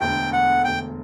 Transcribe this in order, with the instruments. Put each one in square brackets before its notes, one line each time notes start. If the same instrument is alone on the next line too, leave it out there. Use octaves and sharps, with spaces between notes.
[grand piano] E1 D2 D3 [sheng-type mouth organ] G5
[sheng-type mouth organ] F#5
[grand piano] E1 D2 D3 [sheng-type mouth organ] G5